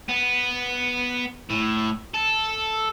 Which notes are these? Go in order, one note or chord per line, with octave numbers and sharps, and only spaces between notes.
B3
A2
A4